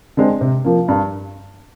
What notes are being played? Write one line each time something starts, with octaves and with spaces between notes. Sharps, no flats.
D3 G#3 C4
C3
F3 A#3
G2